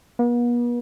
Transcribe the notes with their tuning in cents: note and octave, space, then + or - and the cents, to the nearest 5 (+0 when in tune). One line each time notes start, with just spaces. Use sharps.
B3 -45